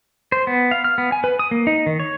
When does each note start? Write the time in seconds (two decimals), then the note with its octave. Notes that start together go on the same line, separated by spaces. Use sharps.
0.32 C5
0.47 B3
0.71 F5
0.84 F6
0.98 B3
1.12 G#5
1.24 B4
1.39 D#6
1.51 A#3
1.67 D#4
1.86 D#3
2.00 C#5